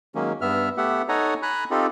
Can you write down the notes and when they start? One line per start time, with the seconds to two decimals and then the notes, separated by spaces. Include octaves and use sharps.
0.15 D#3 F#3 G#3 A#3 C#4
0.41 G2 B3 E5 F6
0.77 A3 B3 G4 E5 F#5
1.09 D#4 A4 C#5 F#5 G#5 A#5
1.42 G#5 A#5 B5 F#6
1.71 C4 D#4 F4 G4 A4